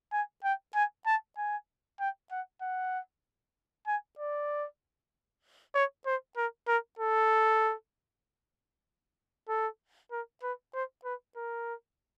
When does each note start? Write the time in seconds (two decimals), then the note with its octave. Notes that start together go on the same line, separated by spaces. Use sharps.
0.13 G#5
0.44 G5
0.75 G#5
1.06 A5
1.38 G#5
2.00 G5
2.31 F#5
2.62 F#5
3.87 G#5
4.19 D5
5.75 C#5
6.06 C5
6.37 A#4
6.68 A#4
6.99 A4
9.49 A4
10.12 A#4
10.43 B4
10.74 C5
11.05 B4
11.37 A#4